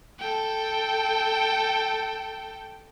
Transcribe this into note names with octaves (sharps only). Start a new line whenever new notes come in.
A4 G5